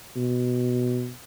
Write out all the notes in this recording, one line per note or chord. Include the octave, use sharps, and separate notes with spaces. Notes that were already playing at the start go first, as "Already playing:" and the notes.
B2